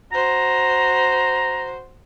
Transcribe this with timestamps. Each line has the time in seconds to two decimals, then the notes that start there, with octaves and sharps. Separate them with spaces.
0.12 F#4 C5 A#5